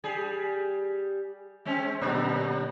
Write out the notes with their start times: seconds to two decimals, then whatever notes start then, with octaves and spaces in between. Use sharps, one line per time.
0.04 G3 G#4
1.65 G#3 C4 C#4
2.02 A#2 D3 F#3